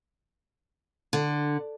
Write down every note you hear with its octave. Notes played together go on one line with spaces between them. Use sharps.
D3